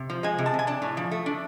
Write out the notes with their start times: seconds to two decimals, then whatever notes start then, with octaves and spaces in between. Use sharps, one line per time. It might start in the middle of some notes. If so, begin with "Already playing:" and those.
Already playing: C3
0.10 F3
0.23 G#3 G#5
0.38 C3
0.46 A5
0.54 C3
0.59 G#5
0.67 D4 A5
0.82 A2
0.97 F3
1.11 A3
1.26 D4